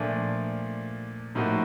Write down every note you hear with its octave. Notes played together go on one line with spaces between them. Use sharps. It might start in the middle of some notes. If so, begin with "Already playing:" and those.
Already playing: A#2 F3 A3 D4
A2 F3 A#3 D#4 F#4